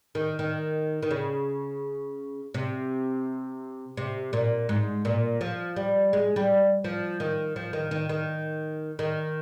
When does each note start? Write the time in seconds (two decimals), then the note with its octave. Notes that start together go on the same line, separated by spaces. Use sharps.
0.15 D#3
0.39 D#3
1.03 D#3
1.11 C#3
2.54 C3
3.97 C3
4.33 A#2
4.69 G#2
5.05 A#2
5.41 F3
5.76 G3
6.13 G#3
6.36 G3
6.84 F3
7.20 D#3
7.56 F3
7.73 D#3
7.91 D#3
8.09 D#3
8.99 D#3